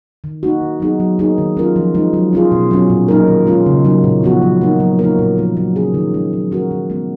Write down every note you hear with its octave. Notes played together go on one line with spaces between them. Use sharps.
D#3
A#3 D#4 F#4
D#3
F#3 B3 D#4 G#4
F#3
A#3 D#4 G#4
D#3
F#3 C#4 F4 A#4
F3
G#3 D#4
F#3
C#4 F4 G#4
B2
F#3 C#4
A#2
F#3 A#3 D#4 A#4
D#3
G#3 C#4 F4
C#3
F#3 A#3 D#4
A#2
F3 B3 F#4
F#3
A#3 D#4
F#3
A#3 D#4 A#4
A#2
F3 A#3
F#3
C#4 G#4
D#3
G#3 C#4
F#3
C#4 F#4 A#4
D#3
G#3 B3